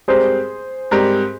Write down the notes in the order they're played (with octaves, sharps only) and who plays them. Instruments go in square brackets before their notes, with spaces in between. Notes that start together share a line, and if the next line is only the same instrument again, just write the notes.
[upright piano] G#2 G3 C4 G4 A#4 [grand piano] G#4 C5
[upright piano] G#2 G3 C4 G4 A#4